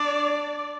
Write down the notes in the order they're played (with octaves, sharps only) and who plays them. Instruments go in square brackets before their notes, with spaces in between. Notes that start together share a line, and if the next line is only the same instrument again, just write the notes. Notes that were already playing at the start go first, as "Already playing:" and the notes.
Already playing: [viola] D4 [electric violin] D5